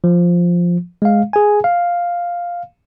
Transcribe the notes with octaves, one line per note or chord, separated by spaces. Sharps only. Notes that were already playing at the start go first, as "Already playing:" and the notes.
F3
G#3 F5
G#4 G#5
F5